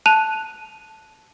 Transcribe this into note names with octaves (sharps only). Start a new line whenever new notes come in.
A5 F#6 D#7 F7